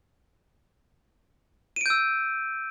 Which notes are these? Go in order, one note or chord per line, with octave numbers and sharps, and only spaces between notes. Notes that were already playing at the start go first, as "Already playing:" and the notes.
E6 G6 D7 D#7